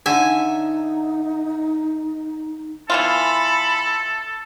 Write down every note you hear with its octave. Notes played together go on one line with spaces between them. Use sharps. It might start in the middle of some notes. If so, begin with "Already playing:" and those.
D3 D#4 E5 G#5
E3 B3 F4 A4 B5